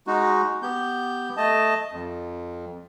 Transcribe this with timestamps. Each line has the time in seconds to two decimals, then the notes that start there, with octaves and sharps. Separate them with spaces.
0.07 G#3 D#4 F#4
0.63 B3 G4 G6
1.37 A3 D#5 A5
1.92 F2